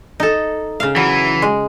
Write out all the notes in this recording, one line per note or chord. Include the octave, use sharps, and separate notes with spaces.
D#4 A4
C#3 F5
E3 F#3
G#3